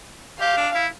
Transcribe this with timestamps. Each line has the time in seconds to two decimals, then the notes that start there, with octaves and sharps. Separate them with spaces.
0.40 G4 F5
0.57 D4
0.75 E4